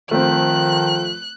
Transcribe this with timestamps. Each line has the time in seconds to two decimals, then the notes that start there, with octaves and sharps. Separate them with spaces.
0.11 D#3 F3 A3 C4 F#6